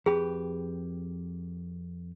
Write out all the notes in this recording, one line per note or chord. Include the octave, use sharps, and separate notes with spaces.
F2 G4 G#4 B4